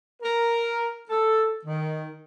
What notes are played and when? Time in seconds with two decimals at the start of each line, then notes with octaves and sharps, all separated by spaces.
0.22 A#4
1.09 A4
1.65 D#3